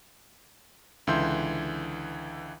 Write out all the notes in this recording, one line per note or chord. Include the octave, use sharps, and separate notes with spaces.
C#2 D3 E3 E5 C6 G6